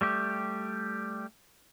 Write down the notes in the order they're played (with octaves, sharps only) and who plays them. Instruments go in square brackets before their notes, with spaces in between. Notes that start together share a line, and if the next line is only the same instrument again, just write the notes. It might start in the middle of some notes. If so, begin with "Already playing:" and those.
[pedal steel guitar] G3 A3 G4